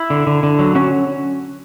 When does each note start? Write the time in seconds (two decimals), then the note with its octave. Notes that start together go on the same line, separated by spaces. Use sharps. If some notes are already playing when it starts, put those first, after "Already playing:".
Already playing: E4
0.10 D3
0.27 D3
0.43 D3
0.59 F#3
0.75 C#4 F#4